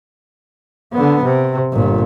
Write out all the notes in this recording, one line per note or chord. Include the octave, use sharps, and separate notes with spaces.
D3 B3
C3
G1 A#2